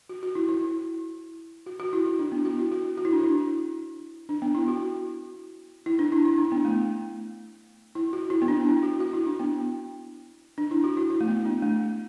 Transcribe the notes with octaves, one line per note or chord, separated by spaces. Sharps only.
F#4
F#4
E4
E4
F#4
F#4
E4
E4
D4
B3
F#4
E4
F#4
F#4
E4
D4
E4
D4
B3
E4
F#4
E4
D4
E4
E4
D4
B3
A3
E4
F#4
E4
B3
D4
E4
F#4
F#4
E4
D4
B3
D4
E4
F#4
E4
E4
A3
B3
D4
A3